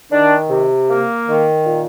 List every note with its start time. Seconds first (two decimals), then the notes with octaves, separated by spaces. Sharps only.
0.11 D#3 D4
0.49 C3
0.89 A#3
1.27 D#3
1.66 A#2